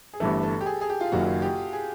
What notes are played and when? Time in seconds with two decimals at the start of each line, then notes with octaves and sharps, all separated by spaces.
0.13 G#4
0.20 G1 G2 E3 A3 A4
0.43 A4
0.61 G4
0.66 G#4
0.81 G#4
0.90 G4
1.01 F4
1.12 F#1 F#2 D#3 F#3 F#4
1.42 G4
1.73 G#4